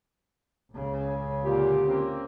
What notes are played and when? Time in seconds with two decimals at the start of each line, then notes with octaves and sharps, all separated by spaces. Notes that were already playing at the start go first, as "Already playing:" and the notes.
0.73 C#2 C#3
1.44 A#2 D3 F4 G4
1.87 A#3 C4 C#4